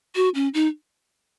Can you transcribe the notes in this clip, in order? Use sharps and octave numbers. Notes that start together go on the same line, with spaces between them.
F#4
C#4
D#4